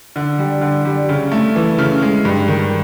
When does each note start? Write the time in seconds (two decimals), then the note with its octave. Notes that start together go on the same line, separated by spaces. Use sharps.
0.16 D3
0.39 G3
0.61 D3
0.85 G3
1.09 C#3
1.32 A3
1.56 E3
1.78 C#3
2.02 G#3
2.25 G2
2.48 D#3